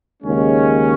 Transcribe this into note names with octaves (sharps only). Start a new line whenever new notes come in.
D#2 C#3 G#3 C#4